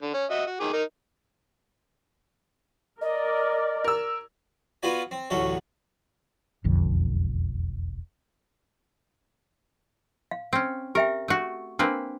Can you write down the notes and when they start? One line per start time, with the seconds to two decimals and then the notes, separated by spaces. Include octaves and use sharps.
0.02 D3
0.14 C#4
0.31 F#4 D#5 E5
0.46 F#4
0.60 D#3 G#4 D6
0.73 D#4 A#4
3.01 A#4 D5 D#5
3.84 A#4 E6
4.83 B3 F4 F#4 B4 D5 G#5
5.11 C4
5.30 A1 D2 F#3 A4 C#5
6.64 E1 B1 F2 D3
10.31 F5
10.53 C4 C#4
10.95 G4 A#4 E5 G5
11.28 A3 F#4
11.79 A#3 C4 D4 A#4 B4